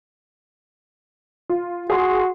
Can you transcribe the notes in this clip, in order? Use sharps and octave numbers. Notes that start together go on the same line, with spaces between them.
F4
F#4 G#4 C6